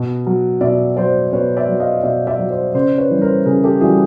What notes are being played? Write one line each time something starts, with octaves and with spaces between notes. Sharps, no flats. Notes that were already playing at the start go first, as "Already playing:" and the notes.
Already playing: B2
F#3
B2 D5 E5
F#3 C5 D5
B2 B4 C#5
D5 E5
F#3
D#5 F5
B2 D5 E5
D5 E5
F#3
C5 D5
C#3 C5 D5
B4 C#5
E3 G3
A#4 C5
C#3 G#4 A#4
G4 A4
E3 G3 F#4 G#4